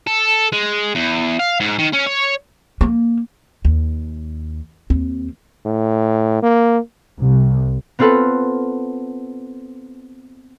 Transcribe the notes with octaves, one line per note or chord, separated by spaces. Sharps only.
A4
G#3
E2
F5
G#2
D#3
C#4
C#5
A#3
D#2
D#2 C4
A2
A#3
C2
B3 C4 F4 A4 B4